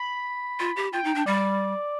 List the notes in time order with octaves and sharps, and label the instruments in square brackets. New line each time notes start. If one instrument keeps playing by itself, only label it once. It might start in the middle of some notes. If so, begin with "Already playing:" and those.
Already playing: [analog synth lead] B5
[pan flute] F4
G4
[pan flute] F4 [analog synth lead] G5
[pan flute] D#4
D4
[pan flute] G3 [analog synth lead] D5